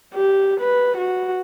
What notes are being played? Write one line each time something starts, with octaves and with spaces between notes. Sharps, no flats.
G4
B4
F#4